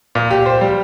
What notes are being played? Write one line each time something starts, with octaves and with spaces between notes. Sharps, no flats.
A#2
G4
C5
G3